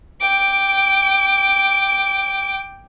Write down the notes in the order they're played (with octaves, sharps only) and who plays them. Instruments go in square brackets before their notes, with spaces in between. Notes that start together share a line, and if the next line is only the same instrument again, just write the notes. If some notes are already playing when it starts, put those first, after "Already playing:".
[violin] G5 D6